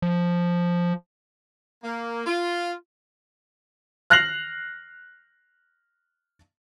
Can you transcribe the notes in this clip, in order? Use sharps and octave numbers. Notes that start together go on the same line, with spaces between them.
F3
A#3
F4
F6 F#6 A#6 C7 F7 F#7